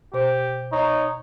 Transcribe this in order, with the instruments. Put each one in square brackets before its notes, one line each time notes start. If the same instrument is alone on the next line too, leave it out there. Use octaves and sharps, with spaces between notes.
[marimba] B2 C5 [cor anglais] G4
[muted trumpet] D#4 [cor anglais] C#5